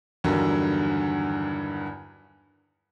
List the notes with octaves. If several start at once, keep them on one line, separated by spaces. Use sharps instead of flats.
E2 G2 D3 D#3 F#3